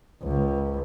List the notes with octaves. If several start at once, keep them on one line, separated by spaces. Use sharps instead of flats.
C#2